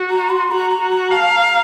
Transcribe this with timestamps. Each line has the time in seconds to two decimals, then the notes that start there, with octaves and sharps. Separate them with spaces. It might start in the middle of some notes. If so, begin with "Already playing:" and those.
Already playing: F#4
0.11 A#5
0.30 C6
0.51 F#4 A#5
0.71 A#5
0.81 F#4
0.91 A#5
1.11 F5 A5
1.31 A#5